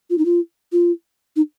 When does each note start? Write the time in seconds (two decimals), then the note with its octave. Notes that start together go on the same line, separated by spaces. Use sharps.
0.10 F4
0.18 D#4
0.25 F4
0.72 F4
1.36 D#4